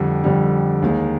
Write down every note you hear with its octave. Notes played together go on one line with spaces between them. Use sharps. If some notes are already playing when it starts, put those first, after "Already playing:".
Already playing: F2 D3 G3
F2 D3 G3
D#2 D#3 G#3